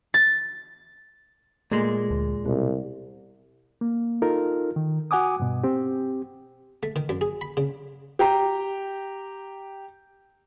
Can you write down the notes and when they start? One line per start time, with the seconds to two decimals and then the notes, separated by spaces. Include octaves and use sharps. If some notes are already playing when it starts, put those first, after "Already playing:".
0.14 A6
1.72 A#2 G#3 A3
2.11 D2
2.46 C2 B2
3.81 A#3
4.22 D#4 F4 A4 A#4
4.76 D#3
5.11 F#4 F#5 G#5 D6 D#6
5.40 G2 B2
5.64 C4 G4
6.83 A3
6.96 D#3
7.09 F#2
7.21 G#4
7.41 B5
7.57 C#3
8.19 G4 G5 A#5